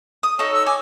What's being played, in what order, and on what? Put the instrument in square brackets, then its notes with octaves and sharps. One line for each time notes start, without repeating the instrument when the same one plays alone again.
[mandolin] D#6
[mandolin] D#4 F#4 A4 [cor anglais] C#5
[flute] E6
[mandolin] G#5 [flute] D6